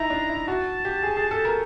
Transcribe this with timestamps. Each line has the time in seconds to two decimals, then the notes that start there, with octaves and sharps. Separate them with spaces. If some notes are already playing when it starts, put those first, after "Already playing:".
Already playing: D#4 E4 A#5
0.10 D4
0.29 E4
0.47 F#4 A5
0.85 G4
1.03 G#4
1.17 G#4
1.31 A4
1.45 A#4